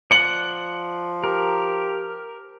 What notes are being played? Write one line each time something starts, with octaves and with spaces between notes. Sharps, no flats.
F3 D5 F#5 C#7 F#7
G4 A#4